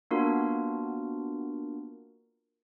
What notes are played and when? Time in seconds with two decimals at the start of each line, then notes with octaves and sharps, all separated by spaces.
0.11 A#3 B3 D4 F4 F#4 A#4